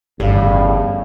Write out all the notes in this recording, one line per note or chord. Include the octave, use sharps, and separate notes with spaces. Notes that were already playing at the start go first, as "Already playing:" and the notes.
G1 E2 A2 C#3 G3 G4 F5